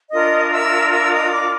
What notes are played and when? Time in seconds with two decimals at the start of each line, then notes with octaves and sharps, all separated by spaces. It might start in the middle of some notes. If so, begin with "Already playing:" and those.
0.11 D4 F4 A#4 D#5 D#6
0.51 E5 E6
0.91 E5 E6
1.12 D#5 D#6
1.32 D5 D6